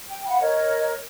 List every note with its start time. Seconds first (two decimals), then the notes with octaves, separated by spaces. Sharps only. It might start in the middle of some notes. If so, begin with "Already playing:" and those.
0.08 G5
0.28 F5 F#5 B5
0.40 A#4 C#5 D#5